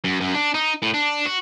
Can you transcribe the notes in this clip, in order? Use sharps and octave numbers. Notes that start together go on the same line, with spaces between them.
F#2
F#2
D4
D#4
A2
D4
F#4